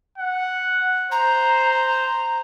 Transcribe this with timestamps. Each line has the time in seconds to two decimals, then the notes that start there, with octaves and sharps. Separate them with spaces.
0.18 F#5
1.12 C5 A#5